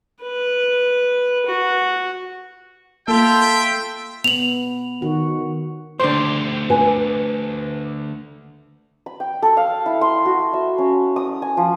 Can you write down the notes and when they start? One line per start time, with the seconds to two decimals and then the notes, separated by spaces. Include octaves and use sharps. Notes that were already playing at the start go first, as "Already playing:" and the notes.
0.22 B4
1.46 F#4
3.08 A#3 F4 A4 E5 G5
4.24 B3 F7 F#7
5.02 D#3 F#4
6.00 D2 D3 G4 C5
6.70 B4 G#5
9.06 B5
9.20 G5
9.42 A4
9.57 F5
9.86 E4
10.01 C6
10.26 F#4
10.53 E5
10.78 C#4
11.16 D#6
11.42 G#5
11.57 F3